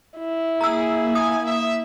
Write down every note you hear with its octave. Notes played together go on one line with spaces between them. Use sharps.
E4
A#3 G#4 A#5 E6
G#5 D#6
E5